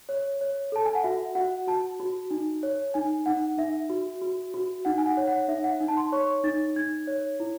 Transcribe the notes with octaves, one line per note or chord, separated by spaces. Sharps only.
C#5
C#5
A4 A5
G#5
F#5
F#4 E5
F#4 F#5
F#4 A5
F#4
D#4
C#5
D#4 G#5
D#4 F#5
D#4 E5
F#4
F#4
F#4
D#4 F#5
G#5
F#5
C#5
F#5
D#4 E5
F#5
D#4
A5
C6
C#5 C#6
D#4 A6
D#4 G#6
C#5
E4